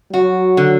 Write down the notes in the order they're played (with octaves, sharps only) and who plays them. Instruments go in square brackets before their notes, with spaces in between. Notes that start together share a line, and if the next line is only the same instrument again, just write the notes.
[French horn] F#3 [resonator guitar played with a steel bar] F#4
[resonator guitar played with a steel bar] D3